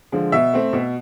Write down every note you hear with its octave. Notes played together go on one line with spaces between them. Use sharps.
D3 F3 G#3
B2 E5
A3 C4
B2